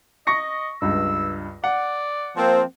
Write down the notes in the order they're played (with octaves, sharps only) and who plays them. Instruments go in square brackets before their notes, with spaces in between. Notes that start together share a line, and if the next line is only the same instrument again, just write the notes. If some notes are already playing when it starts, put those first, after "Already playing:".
[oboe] D#5 [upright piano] C#6 A#6 C#7
[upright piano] C#2 G2 [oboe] E6
[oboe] D5 [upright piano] F#5
[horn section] F3 A#3 C4